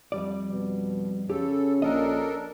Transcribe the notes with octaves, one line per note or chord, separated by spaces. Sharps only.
F2 G3 D5
B2
C#3 C#4 G4 A4
A#1 D4 A4 A#4 D#5